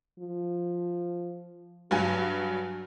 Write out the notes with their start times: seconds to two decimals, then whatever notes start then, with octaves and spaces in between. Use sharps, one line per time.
0.19 F3
1.91 G2 F#3 F#4 G#5